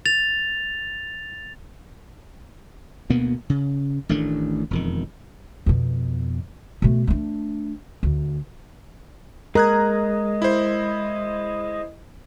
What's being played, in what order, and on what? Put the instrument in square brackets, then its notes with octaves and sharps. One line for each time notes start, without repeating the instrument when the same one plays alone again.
[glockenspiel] A6 F7
[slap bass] D2 B2 A#3 B3
C#3
A1 D#3 A3 D4
E1 F2 D#3
[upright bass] F2 B2
B2 A3
A3 D4
D2
[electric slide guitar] G#3 [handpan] A#4 [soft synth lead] D#5 [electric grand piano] A#5 F#6 G#6
[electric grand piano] E4 C5